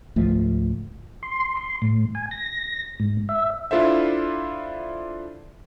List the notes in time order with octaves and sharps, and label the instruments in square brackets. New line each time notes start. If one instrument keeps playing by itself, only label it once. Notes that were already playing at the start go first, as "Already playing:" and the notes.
[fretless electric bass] C#2 G#2 F3 A3
[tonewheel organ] C6
C6
A2
G#5
A#6
G#2
E5
[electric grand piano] D4 E4 F4 A4 C5 E5